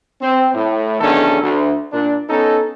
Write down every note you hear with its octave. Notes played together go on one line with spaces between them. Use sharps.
C4
A2
B1 E2 D#3 C#4 D4 A4
D2
A#2 D4
B3 C#4 D#4 A4